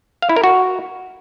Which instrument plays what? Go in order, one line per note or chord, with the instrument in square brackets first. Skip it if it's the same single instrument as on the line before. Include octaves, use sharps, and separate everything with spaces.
[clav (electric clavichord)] F5
E4
A#4
F#4